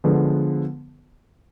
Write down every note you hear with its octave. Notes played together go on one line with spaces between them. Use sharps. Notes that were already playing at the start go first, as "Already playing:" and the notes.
D3 F3 G#3 B3